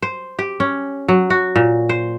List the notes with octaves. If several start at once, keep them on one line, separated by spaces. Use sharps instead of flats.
C5
G4
C#4
F#3
F#4
A#2
C5